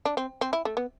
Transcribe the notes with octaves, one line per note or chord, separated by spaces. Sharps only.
D4
C4
C4
E4
A3
B3